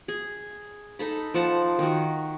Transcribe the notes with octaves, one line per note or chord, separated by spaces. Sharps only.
G#4
D#4 A4 B5
F3 F#5 A5
D#3 F#4